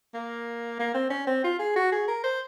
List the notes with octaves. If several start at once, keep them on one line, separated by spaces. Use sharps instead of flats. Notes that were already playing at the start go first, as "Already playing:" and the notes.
A#3
A#3
C4
C#4
C4
F4
G#4
F#4
G#4
A#4
C5